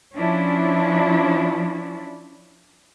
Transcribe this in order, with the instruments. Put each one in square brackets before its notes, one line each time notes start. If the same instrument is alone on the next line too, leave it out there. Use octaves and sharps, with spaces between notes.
[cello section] F3 C#4 D4 E4